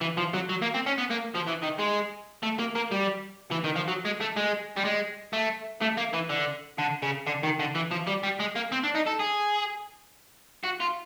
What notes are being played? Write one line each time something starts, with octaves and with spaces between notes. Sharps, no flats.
E3
F3
F#3
F#3
A#3
C4
C#4
B3
A#3
F3
E3
D#3
G#3
A3
A#3
A#3
G3
E3
D#3
F3
F#3
G#3
A3
G#3
G3
G#3
A3
A3
A#3
E3
D3
D3
C#3
D3
D#3
D3
E3
F3
G3
G3
G#3
A#3
C4
D4
D#4
A4
G#4
F#4
F4